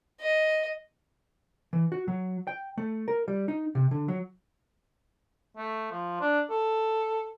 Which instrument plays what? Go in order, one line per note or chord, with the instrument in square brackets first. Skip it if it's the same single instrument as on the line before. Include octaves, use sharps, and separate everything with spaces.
[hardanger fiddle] D#5
[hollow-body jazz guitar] E3
F#4
F#3
G5
A3
A#4
G3
D#4
C3
D3
F#3
[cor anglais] A3
F3
D4
A4